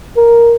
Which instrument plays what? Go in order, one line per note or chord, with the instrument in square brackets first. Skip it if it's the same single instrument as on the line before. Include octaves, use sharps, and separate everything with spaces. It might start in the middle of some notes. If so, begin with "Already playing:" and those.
[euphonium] A#4